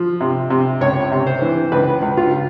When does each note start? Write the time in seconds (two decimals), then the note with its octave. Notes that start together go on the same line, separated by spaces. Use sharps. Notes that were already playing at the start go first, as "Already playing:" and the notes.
Already playing: F3
0.21 C3
0.50 C3
0.81 C#2 C#5
1.12 C3
1.27 C5
1.42 E3
1.72 C#2 B4
2.02 C#2
2.17 F4